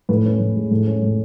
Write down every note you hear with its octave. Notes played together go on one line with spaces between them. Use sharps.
A2 B4
C#4
A2
G#3
A2
C#4
A2